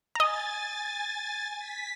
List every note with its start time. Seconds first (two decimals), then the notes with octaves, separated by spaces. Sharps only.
0.15 D#5 G#5 A#5 A6
1.59 B6